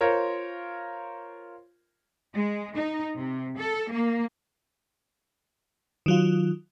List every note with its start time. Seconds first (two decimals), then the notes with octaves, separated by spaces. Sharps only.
0.01 F4 A#4 C5 C#5
2.34 G#3
2.76 D#4
3.17 C3
3.58 A4
3.91 A#3
6.06 D#3 F#3 F4